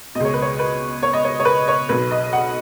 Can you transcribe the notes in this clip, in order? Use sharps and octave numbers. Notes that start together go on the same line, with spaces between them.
C#2 B2 C#5 D#5
B4
C#5
B4
C#5
D#5
C#5
C#5
B4
C#5
B1 B2 B4
D#5
F#5